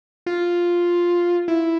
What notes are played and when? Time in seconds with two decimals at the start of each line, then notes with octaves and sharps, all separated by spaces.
0.26 F4
1.48 E4